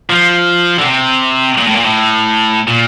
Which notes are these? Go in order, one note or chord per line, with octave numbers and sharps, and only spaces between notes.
F3
D3
C3
A#2
A2
A#2
A2
A#2